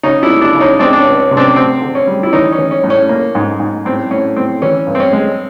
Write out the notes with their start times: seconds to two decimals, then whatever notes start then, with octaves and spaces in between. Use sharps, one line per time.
0.03 C#3 C#4 D#4
0.23 D4 E4
0.29 A#3
0.41 D4 E4
0.54 C#3
0.61 C#4 D#4
0.80 G#3 C4 D4
0.93 D4
0.99 C#4
1.05 C#2
1.19 C#4
1.31 C3
1.37 C4 D4
1.56 D2 C4
1.82 D3
1.95 C#4
2.07 G3
2.23 E4
2.33 E3 C#4 D#4
2.52 C#4
2.58 E3
2.71 C#4
2.84 A2
2.90 C#4
3.09 A#3
3.35 G#2
3.60 G#2
3.85 A2 C4
4.11 A2 C#4
4.36 A2 C4
4.62 E3 C#4
4.87 G2
4.95 C4
5.00 C#4
5.13 G#3